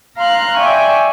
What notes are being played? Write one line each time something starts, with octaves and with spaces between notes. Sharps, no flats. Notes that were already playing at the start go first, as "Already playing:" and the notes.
F5 A#5 C6 F6 F#6
D5 E5 G5 G#5 C#6